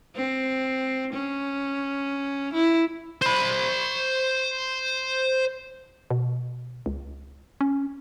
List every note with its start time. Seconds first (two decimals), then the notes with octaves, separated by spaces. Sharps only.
0.16 C4
1.13 C#4
2.53 E4
3.22 C5 B5
6.10 B2
6.86 C#2
7.61 C#4